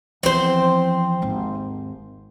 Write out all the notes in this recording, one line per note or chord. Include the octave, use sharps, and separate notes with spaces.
E2 F3 C4 C5
G#1 D#2